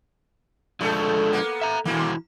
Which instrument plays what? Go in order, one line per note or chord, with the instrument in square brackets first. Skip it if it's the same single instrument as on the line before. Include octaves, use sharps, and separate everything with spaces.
[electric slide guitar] F3 G#3 D4 [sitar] A3 A4
[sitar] A#3 B3
[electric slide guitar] E5 A#5
[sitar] D#2 A#3 [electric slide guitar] E3 E4 F#4